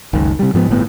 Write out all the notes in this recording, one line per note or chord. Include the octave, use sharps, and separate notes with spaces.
F#1 C#2 D#3
C3 G3
G#2 F3 G3 B3
G1 A2 B3